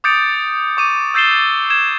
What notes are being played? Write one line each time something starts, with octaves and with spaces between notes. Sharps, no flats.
D6 D#6 G6 A6 C#7 D7
C#6 D6 D#7
E6 G6 A6 C7 E7 G7
G#6 E7